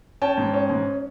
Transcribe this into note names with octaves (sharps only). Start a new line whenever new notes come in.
C#4 G5 A5
G#2
C#4
G#2